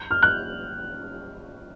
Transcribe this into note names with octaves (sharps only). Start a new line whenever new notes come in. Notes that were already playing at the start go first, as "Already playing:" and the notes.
Already playing: G6
F6
F#6